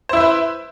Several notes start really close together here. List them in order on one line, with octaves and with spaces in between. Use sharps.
C5 E4 E5 B4